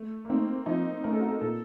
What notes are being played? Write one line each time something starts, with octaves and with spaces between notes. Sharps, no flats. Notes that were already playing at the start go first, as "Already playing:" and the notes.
Already playing: A3
A#3
A3 C4 D#4
F3 D#4
A3 C#4 A#4
A4
F#4
A4
A#2 A4